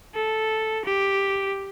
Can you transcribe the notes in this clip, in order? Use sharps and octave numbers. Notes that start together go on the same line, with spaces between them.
A4
G4